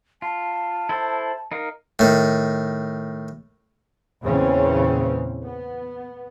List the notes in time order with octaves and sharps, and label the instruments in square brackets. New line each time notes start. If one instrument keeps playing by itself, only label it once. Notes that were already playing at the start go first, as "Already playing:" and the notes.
[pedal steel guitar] F4 [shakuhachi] A5
[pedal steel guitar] E4 A4 C5
D#4 A#4 F5
[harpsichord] A2 D#3
[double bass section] E2 A#2 C#3 E3 C4 C#4
B3